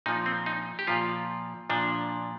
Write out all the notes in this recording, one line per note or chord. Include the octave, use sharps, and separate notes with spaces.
A#2 F3 D#4
C4
D#4
G4
A#2 F3 F4
A#2 F3 D4